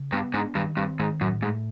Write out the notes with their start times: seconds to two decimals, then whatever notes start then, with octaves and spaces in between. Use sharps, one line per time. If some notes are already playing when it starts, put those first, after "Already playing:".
Already playing: C#3
0.12 G2 B3
0.34 G#2 D4
0.55 G2 D#3
0.77 G2 C4
0.99 G#2 D#3
1.21 F#2 A2
1.42 G#2 A3